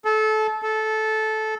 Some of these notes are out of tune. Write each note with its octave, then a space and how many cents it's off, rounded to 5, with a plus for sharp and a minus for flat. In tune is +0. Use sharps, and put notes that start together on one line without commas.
A4 -25
A4 -15